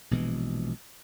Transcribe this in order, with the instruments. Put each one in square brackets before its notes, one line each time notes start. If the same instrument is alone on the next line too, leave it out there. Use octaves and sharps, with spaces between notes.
[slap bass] A#1 B2 E3 G#3